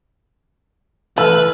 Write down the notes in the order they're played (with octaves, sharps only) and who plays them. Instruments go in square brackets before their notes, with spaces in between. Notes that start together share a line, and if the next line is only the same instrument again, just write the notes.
[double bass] E3 [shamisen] A3 [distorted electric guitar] B4 [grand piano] E6 F6 F#7